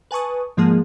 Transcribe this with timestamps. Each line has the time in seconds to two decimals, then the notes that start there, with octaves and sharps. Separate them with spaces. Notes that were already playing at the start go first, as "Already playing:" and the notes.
0.11 B4 G#5 A5 C#6 D#6
0.57 G#2 F3 G#3 A#3 G#4 A5